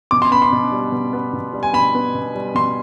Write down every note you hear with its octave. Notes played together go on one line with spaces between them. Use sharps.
B2 D6
C6
B3 B5
C6
B2
G3
B2
B3
B2
G3
G#5
B2 B5
B3
B2
G3
B2 C6